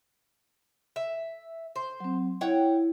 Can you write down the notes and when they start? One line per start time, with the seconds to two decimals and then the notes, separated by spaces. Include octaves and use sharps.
0.96 E5
1.76 C5
2.00 F#3 C4
2.41 E4 C#5 F#5 G5